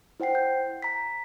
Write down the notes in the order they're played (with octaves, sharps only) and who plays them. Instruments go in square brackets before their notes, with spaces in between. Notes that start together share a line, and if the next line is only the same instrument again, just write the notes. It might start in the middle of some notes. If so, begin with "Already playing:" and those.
[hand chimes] E4 C5 F#5 G5 C7
G6
A#5 B6